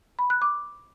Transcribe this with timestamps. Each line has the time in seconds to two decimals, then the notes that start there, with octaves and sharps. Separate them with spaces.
0.19 B5
0.30 F#6
0.42 D6